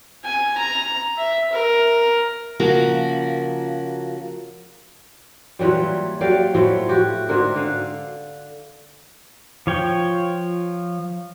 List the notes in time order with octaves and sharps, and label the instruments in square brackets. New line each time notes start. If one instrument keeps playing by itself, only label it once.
[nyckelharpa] G#5
A#5
E5
A#4
[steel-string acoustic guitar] C#3 F3 A#3 F#4 A#4
[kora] A#2 E3 F#3 G3
F#3 G4 D5 F5
A2 F3 F#3 A3
F#4 G4
G#2 D3 F#4 A#4
D3 F5
[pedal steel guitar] F3 C#5 G5